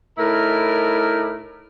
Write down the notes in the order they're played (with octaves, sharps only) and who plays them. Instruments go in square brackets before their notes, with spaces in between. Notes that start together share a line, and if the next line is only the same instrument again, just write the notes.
[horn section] A2 D#4 E4 A#4